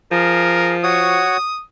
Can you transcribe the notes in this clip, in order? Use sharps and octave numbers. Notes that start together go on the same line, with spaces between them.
F3 G#4 A#4
F#4 C#5 F#5 D#6